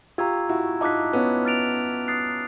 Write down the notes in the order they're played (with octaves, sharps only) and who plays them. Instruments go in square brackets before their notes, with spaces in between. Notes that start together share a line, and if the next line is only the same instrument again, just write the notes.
[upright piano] F4 G4 [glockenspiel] A#5 C#6 E6 G#6
[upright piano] E4 F#4
[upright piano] D#4 F4 [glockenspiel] A5 D6 F#6 B6
[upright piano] B3 C#4
[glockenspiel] F6 A6 D7 F7
D#6 F#6 A6 C7